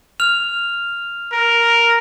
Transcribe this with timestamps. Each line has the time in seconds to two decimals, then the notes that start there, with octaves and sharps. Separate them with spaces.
0.20 F6 F7
1.32 A#4